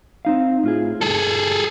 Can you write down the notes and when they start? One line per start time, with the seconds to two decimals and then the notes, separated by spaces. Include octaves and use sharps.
0.25 C4 D#4 F5
0.63 A2 F4 G#4
1.01 G2 G#4 A4